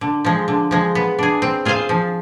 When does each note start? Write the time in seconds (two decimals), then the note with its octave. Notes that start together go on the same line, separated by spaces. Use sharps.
0.01 D3
0.25 F3 G#3
0.48 D3
0.71 F3 G#3
0.95 B3
1.19 D4 G#4
1.42 C4
1.65 F4 G#4 C5 F5
1.89 F3